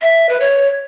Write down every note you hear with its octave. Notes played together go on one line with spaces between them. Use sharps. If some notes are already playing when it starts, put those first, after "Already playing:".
E5
B4
C#5